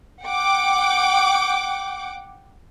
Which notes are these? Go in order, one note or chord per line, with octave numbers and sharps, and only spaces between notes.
F#5 G5 D6